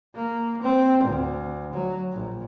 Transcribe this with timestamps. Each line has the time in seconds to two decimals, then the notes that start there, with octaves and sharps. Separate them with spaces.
0.15 A#3
0.62 C4
1.03 D2
1.73 F#3
2.12 A#1